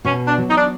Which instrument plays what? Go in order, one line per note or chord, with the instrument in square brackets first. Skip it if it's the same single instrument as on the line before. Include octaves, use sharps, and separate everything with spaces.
[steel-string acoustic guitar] B2 [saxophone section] C#4
[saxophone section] D4
[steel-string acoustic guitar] F#3
[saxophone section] D#4
D4